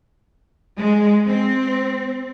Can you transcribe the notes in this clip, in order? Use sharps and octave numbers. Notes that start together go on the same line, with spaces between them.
G#3
C4